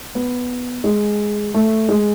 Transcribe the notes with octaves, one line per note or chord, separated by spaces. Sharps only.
B3
G#3
A3
G#3